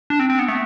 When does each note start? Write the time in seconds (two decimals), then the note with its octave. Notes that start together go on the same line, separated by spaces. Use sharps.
0.10 D4
0.20 C4
0.30 C4
0.39 B3
0.48 A3